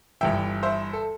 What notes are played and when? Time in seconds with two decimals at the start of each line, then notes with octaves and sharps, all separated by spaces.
0.21 G1 G2 E3 E5 G5
0.63 C5 E5
0.93 A4